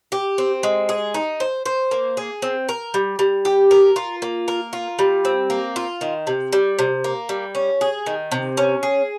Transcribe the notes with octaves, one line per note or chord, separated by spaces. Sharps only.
G4
C4
G#3
G#4
D#4
C5
C5
A#3
G#4
C4
A#4
G3
G3
G4
A#4
F4
A#3
A#4
F4
G3
C4
A#3
F4
D#3
C3
G3
C3
A#3
G3
C#4
G#4
D#3
C3
C#4
G#4